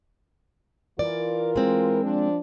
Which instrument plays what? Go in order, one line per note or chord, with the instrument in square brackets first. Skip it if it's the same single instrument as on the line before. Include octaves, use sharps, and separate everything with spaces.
[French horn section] E3 F4 A#4 [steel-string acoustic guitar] D5
[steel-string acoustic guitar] G#3 C4
[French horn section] F3 D4